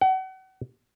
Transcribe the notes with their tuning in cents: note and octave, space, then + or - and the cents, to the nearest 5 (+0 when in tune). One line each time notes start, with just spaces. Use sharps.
F#5 +35